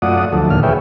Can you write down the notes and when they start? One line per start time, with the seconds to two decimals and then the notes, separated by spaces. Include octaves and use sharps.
0.02 F#2 A3 F4 D5 F#5 D#6
0.32 D2 F3 F#3 A4
0.50 D#2 A#2 D3 F#3 F6
0.63 G#4 B4 C#5 E5 G5